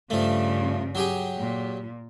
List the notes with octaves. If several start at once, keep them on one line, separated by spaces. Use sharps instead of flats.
G2 C#3 F3 A3
F#3 G4 G#4
A#2